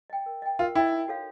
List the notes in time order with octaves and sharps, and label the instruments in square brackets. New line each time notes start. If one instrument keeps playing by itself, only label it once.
[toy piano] D#5 G5
A#4
D#5 G5
[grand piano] F4 [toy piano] A#4
[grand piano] E4 [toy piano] D#5 G5
[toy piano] D#4
F#4 A4 C#5 F5